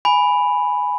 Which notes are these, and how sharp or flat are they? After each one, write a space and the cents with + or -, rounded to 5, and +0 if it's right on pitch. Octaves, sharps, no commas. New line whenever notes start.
G#5 +0 B5 +0